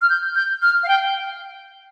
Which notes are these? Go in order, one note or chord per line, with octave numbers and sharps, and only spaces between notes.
F6
G6
G6
F6
F5
G5